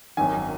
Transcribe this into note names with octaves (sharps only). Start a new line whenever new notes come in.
G#1 F#2 D#3 G#5